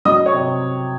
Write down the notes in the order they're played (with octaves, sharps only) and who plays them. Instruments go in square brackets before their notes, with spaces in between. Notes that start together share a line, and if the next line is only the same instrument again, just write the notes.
[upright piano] F#3 D#5 D#6
C#5 C#6
C3